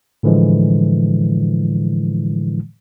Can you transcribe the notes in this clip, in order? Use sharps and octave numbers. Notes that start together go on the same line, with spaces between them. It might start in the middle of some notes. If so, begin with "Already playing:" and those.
A2 D3 E3 F3 G#3